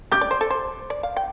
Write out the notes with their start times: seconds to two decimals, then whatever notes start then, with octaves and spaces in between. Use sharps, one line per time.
0.12 G4 D6 G6
0.21 D5
0.31 C5
0.41 A4
0.50 C5
0.90 D5
1.03 F5
1.17 G5